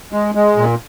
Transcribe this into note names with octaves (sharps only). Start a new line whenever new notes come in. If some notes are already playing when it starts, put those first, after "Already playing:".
G#3
G#3
A#2